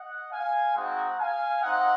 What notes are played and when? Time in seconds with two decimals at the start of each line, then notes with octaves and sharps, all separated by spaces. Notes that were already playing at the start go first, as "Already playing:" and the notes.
Already playing: D#5 F#5
0.31 F5 G#5
0.75 G#3 C4 D#4 F#4 F#5 A#5
1.18 F5 G#5
1.62 C4 D#4 D#5 F#5